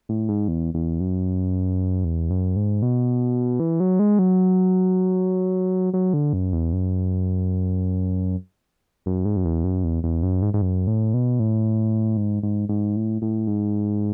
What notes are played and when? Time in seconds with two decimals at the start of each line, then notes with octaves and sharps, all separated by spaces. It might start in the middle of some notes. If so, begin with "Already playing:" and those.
0.09 A2
0.29 G#2
0.48 E2
0.74 E2
1.00 F#2
2.04 E2
2.30 F#2
2.56 G#2
2.82 B2
3.60 E3
3.80 F#3
3.99 G#3
4.19 F#3
5.94 F#3
6.14 D3
6.33 F#2
6.53 E2
6.73 F#2
9.06 F#2
9.25 G#2
9.37 F#2
9.45 E2
9.64 F#2
9.84 E2
10.04 E2
10.23 F#2
10.42 G#2
10.54 G#2
10.62 F#2
10.87 A2
11.14 B2
11.40 A2
12.17 G#2
12.43 G#2
12.69 G#2
12.96 A2
13.22 A2
13.47 G#2